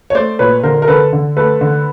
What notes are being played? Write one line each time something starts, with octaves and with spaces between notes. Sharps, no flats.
C#5
A3 C5 D5
A#2 B4 C#5
D3 A#4 C5
A#4
D3 A4 B4
D3
A3 A4 B4
D3